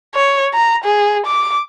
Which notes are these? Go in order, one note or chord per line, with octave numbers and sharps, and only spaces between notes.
C#5
A#5
G#4
D6